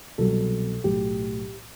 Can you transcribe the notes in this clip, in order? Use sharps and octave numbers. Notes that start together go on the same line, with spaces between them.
C2 B2 F#3 A4
B1 A2 F#3 G4